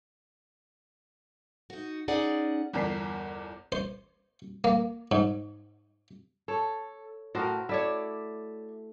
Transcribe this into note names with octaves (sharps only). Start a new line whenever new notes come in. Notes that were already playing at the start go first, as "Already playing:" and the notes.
D#4 F#4
C#4 D#4 G#4 D5 F#5
G1 E2 D4 A#4 B6 C7
C5
A#3
G#2
A4 C#5
A2 F#4 A#4 C5
A3 E4 C#5 D5 E5